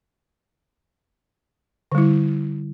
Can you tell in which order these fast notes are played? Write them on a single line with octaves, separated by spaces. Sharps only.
D3 G3 E4